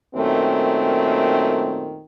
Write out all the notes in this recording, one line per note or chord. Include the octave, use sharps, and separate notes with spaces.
F#2 A#2 D#3 A3 C4